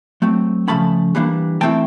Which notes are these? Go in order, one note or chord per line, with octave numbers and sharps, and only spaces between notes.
F#3 A3 C4
C#3 F3 A3 C#4 A5 B5
E3 G3 A#3 D4
E3 A3 C4 E4 G5 A5